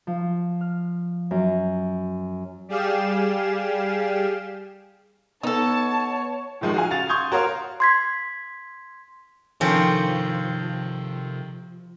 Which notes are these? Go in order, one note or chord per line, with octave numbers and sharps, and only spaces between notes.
F3
F6
F#2
G3 G4 G#4 F5 E7
B3 D#4 A4 C#5 F#5 A5
A2 D#3 F3 G#3
F#4 G#4 F5 G#5
C#3 F#4 F#5 A6 F7
C6 C#6 D#6 G6 G#6
F#4 A#4 C#5 F5 C6
C6 G#6 B6
C3 D#3 F3 C4 C#4 A4 C#5